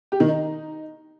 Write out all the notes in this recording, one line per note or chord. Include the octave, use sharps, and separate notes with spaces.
G4
D#3
D#4